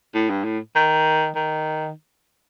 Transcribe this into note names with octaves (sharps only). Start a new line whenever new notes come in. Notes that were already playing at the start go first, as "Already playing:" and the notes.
A2
G2
A2
D#3
D#3